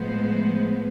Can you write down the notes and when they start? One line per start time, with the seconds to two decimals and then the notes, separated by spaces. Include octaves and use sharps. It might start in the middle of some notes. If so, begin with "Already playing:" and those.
Already playing: A2 F3 G#3 B3 C5